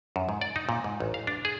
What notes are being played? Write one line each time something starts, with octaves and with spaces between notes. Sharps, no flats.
F#2
G#2
D5
D#4
A#2
G#2
A1
F5
D4
G#4